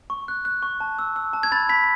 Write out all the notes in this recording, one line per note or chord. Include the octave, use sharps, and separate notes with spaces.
C#6
F#6
F#6
C#6
A5
E6
E6
A5
G#6
B5 A6
B5 B6